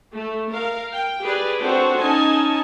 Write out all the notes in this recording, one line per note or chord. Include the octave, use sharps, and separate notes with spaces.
A3
A#4 F5
G5
G4 G#4 B4 D5
C4 D4 F#4 A4 C5 C#5
C#4 D#4 G#5 A5